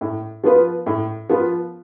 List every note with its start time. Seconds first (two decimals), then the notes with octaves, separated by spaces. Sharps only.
0.01 A2
0.44 F3 B3 F4 B4
0.86 A2
1.29 F3 B3 F4 B4